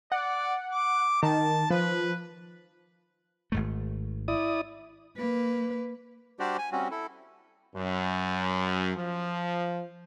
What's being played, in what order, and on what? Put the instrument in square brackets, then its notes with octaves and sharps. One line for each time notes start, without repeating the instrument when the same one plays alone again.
[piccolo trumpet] D5 [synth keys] F#5
[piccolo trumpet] D6
[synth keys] D#3 [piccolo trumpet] A5
[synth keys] F3 [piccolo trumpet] B4
[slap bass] G#1 G#2 A3
[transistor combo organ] E4 D5 D#6
[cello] A#3 B4
[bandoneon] G3 D4 F#4 G4 C5 D5
G#5
G3 C4 C#4 F#4
E4 A4
[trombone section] F#2
F3